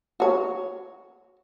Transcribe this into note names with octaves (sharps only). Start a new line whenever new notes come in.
F#4 C#5